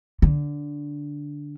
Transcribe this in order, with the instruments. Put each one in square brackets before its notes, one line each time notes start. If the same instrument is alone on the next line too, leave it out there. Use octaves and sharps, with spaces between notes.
[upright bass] D3